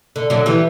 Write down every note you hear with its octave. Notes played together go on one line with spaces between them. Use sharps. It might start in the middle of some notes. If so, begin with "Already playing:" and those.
D3
D3 F#3
E3 G3